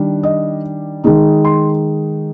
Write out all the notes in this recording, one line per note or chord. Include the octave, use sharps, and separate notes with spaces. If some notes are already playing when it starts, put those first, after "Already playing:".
Already playing: D#3 G3 D4
D#5
D#3 G#3 D#4
C6